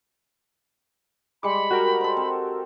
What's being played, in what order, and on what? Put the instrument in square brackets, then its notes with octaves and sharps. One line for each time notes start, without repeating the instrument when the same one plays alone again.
[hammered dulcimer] G3 G#3 [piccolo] B5 [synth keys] D6 C#7
[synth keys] F#4 G4 A#4
[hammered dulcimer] A4 C5
C4